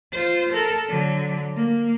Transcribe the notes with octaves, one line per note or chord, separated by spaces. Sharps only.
F4 C5
A4 A#4
D3 F#3
A#3